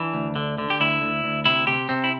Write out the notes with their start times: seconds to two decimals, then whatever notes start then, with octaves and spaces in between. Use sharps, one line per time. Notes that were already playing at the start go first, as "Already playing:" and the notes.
Already playing: E3 D4
0.14 D2
0.36 D3
0.58 D3
0.70 G4
0.80 D2 E4
1.02 D2
1.24 D2
1.45 C3 E4
1.67 C3 G4
1.89 C3 C4
2.04 E4